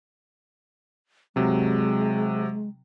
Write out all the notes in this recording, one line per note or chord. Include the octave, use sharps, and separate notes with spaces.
C3 F#3 G#3